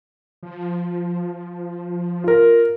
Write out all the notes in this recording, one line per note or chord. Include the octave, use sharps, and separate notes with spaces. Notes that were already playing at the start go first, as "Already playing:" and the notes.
F3
F4 A#4